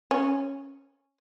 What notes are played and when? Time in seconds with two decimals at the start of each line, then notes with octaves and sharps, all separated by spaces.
0.11 C#4